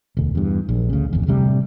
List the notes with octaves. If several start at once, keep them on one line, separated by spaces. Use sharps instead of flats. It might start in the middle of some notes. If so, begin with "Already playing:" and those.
E1 D2
E2 G2
A#1
D2 C#3
G#1 E2
D1 D2 C3 G3